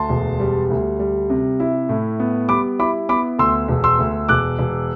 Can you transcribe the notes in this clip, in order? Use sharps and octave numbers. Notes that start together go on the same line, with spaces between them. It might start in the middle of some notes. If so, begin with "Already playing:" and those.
Already playing: D2 A5 C6
E1
G3
D2
G3
C3
E4
A2
B3
G3 B5 D6
E4 B5 D6
B3 B5 D6
D2 C6 E6
E1
C6 E6
D2
E1 D6 F#6
E1